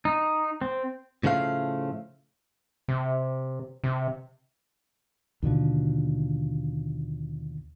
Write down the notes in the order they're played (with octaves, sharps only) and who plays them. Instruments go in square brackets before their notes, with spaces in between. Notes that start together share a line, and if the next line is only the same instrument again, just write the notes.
[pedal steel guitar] D#4
C4
[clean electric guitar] A2 C#3 F3 A3 F5
[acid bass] C3
C3
[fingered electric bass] D#2 B2 D3 F3